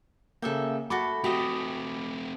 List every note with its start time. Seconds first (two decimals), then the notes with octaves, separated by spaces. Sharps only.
0.42 C#3 A#3 A4 E5 G5
0.90 A3 F#4 A4 B5 D6
1.24 A3 C4 F#4 G4 D#5